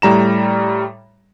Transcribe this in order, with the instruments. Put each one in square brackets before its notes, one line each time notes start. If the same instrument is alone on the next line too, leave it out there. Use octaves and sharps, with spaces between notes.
[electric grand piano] A2 G3 A#5 E7